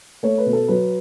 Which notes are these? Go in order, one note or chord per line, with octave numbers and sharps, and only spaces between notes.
A3 C#5
B4
B2
A4
F#3 B4